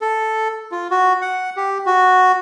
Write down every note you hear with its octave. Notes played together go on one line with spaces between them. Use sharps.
A4
F4
F#4
F#5
G4
F#4